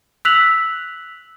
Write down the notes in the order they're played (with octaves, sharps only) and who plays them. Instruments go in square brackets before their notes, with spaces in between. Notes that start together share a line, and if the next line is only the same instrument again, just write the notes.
[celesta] E6 F#6 B6 F7 F#7